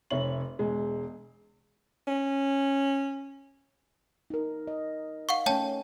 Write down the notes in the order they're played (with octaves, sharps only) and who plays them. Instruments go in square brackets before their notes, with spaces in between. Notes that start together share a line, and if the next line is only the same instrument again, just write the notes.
[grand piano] F1 C#5 E5 F#7
E1 G#3
[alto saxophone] C#4
[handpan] D#4 A#4
D#5
[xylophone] F5 F#5 C#6
[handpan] A3 C#4 [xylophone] C#5 G5 A5